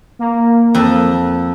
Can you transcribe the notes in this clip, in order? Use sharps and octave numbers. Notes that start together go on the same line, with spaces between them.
A#3
F2 A5